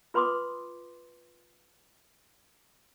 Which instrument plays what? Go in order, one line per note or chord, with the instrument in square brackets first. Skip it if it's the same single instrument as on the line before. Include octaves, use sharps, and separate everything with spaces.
[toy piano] F4 B4 B5 C6 D6 D#6